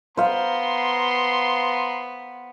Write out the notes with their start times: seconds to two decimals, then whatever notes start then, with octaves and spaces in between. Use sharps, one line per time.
0.17 B3 C5 F5 A#5 C6